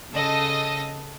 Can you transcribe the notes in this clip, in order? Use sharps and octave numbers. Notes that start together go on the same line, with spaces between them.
C#3 A4 D#5 A#6